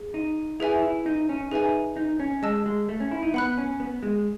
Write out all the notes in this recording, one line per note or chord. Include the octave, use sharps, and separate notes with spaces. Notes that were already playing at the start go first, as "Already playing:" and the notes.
Already playing: G#4
D#4
E4 G#4 B4 E5 G#5
E4
D#4
C#4
D#4 G#4 B4 E5 G#5
D#4
C#4
G#3 D#5 A5 E6
G#3
A3
C#4
E4
D#4
B3 F#5 B5 F#6
C#4
B3
G#3